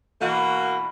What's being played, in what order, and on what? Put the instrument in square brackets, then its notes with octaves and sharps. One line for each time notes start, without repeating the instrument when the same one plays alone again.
[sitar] B2 E3 [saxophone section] A#3 F#4